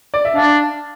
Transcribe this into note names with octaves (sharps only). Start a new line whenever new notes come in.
D5
E5
D4 F5